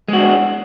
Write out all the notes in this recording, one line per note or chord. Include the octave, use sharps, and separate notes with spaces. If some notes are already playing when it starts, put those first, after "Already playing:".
G#3 D4 F#4